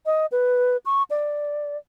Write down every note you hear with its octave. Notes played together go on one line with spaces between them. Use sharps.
D#5
B4
C#6
D5